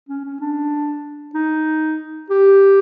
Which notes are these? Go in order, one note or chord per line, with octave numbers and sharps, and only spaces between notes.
C#4
C#4
D4
D#4
G4